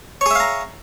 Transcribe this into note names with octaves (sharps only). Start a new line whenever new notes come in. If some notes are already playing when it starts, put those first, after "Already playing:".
G#4 C#5 E5 F5 A#5